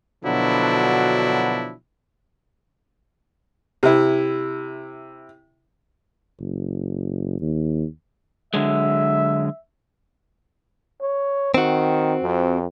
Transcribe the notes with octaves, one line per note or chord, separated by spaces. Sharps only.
B2 D3 F3 F#3 D4 E4
C3 E4
F#1
D#2
D3 F#3 G#3 E5
C#5
D#3 C4 F#4
F2